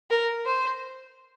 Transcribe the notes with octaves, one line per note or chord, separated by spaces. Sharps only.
A#4
C5